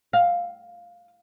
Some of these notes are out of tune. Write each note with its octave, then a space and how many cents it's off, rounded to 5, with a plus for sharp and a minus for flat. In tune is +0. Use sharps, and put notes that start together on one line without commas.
F5 +5